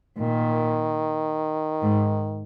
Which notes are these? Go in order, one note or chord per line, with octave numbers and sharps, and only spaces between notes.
A#2 D#3
G#2